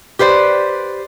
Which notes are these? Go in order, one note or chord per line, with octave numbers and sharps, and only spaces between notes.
G4 B4 C5 D5